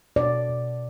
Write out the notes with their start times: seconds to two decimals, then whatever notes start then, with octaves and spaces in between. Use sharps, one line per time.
0.16 B2 D5
0.49 B2